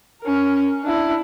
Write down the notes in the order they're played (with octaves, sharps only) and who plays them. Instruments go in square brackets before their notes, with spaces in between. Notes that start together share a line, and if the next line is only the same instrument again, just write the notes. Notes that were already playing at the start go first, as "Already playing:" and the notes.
[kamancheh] C#4 A#4
D4 E4